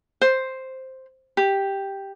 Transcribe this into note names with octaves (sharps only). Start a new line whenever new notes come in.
C5
G4